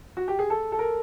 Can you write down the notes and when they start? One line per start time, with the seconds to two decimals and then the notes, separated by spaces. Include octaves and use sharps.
0.17 F#4
0.28 G4
0.39 G#4
0.50 A4
0.72 A4
0.79 A#4